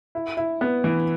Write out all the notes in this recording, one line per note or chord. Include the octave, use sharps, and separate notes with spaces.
E4
E4
B3
E3